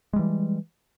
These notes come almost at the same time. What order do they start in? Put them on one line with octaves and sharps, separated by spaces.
G#3 G3 E3